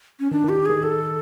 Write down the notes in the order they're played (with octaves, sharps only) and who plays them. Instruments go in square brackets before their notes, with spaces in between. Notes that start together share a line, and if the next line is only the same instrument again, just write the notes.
[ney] C#4
[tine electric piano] D#3 [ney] D4
[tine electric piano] D#3 [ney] G4
[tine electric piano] D#3 [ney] G#4
[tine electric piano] D#3 [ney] A4